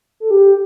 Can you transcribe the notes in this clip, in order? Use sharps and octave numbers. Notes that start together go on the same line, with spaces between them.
A4
G4